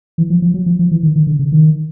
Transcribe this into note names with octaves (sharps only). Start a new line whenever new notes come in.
E3
F3
F3
F#3
F3
F3
E3
D#3
D#3
D3
C#3
D#3